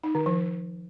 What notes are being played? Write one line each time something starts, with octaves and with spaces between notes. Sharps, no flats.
D#4
D#3
F3